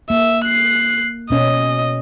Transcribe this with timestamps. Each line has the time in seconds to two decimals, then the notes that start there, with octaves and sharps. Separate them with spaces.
0.10 A#3 E5
0.44 F#6 C7
1.30 B2 C#4 D#5